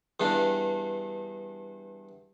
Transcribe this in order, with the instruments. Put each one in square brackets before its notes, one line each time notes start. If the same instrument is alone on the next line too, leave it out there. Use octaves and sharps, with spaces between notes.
[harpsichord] E2 G2 D4